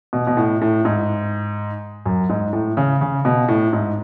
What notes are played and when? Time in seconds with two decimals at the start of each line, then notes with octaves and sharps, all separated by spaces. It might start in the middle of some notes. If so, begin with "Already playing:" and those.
0.13 B2
0.27 B2
0.37 A2
0.61 A2
0.85 G#2
2.06 F#2
2.29 G#2
2.53 A2
2.77 C#3
3.01 C#3
3.25 B2
3.48 A2
3.73 G#2